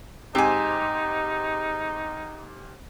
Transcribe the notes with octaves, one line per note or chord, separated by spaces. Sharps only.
G#2 C4 D#4 G4 G#5